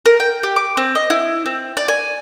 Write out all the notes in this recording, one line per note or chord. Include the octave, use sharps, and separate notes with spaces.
A#4
G5
G4
D6
C4
D#5
E4
C4
D5
G#5